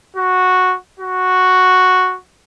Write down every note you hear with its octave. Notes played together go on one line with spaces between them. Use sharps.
F#4
F#4